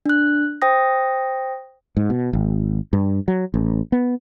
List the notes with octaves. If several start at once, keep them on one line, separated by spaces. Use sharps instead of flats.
D4 F#6
C5 G5 D#6 A#6
G#2
B2
G#1
G2
F#3
A1
B3